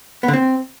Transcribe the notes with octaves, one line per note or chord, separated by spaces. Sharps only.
B3
D3
C4